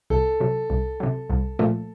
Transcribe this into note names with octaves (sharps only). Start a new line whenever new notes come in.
C2 A4
C3 F#3
C2
C3 F#3
C2
A#2 F3 A3